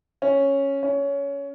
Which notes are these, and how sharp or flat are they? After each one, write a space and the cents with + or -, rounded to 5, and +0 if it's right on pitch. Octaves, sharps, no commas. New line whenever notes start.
C#4 -5
C#4 +15